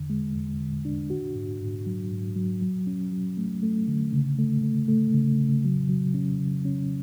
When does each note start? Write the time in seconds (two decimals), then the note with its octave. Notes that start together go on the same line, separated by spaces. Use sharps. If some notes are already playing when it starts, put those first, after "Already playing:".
Already playing: E2 D3
0.10 G#3
0.35 E2
0.60 D3
0.85 D4
1.10 F#4
1.35 G#2
1.60 G#2
1.86 F#3
2.11 G#2
2.36 F#3
2.61 F#3
2.87 C#4
3.12 F#3
3.37 A3
3.63 A3
3.88 D3
4.13 C#3
4.39 A3
4.63 A3
4.88 A3
5.14 C#3
5.39 C#3
5.64 F#3
5.89 F#3
6.14 C#4
6.40 C#3
6.65 C#4